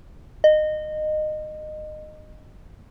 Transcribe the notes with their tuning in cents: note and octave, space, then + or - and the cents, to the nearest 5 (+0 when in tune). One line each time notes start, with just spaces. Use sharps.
D#5 -20